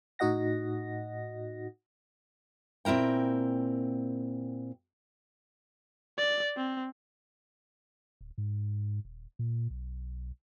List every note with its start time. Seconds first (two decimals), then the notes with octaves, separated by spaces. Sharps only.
0.19 A2 D#4 F#4 D#5 F#5 A#6
2.85 A#2 C4 E4 A#4 G5
6.18 D5
6.57 C4
8.21 D1
8.38 G#2
9.05 D#1
9.39 A#2
9.70 B1